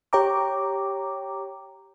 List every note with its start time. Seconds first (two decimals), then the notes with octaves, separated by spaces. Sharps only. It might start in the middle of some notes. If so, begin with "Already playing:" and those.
0.13 G4 C#5 G5 A#5 D6